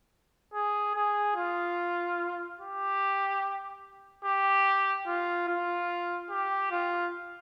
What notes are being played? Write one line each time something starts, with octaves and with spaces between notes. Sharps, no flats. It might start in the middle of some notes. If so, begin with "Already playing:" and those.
G#4
G#4
F4
G4
G4
F4
F4
G4
F4